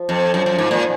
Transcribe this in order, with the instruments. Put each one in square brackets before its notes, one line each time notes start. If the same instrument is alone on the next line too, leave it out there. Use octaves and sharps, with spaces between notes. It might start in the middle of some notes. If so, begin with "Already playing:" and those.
Already playing: [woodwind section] F3
[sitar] F2
F#2
F#2
G#2
A#2